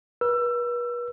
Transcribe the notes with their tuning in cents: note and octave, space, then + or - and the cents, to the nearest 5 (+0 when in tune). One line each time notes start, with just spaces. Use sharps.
B4 -40 E6 +25